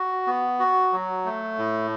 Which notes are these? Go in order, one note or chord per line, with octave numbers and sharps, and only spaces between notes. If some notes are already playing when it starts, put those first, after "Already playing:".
Already playing: F#4
B3
F#4
F#3
A3
A2